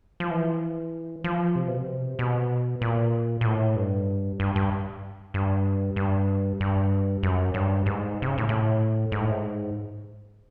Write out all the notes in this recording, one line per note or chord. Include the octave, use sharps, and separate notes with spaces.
F3
E3
F3
C3
B2
C3
B2
A#2
A#2
A2
G2
G2
G2
G2
G2
G2
F#2
G2
G#2
C3
C#3
A2
A2
G#2
A2
G#2